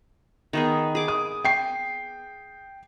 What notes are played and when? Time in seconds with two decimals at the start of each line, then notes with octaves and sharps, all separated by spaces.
0.53 D#3 B3 G#4
0.95 G#4 D6
1.08 D#6
1.45 G5 C7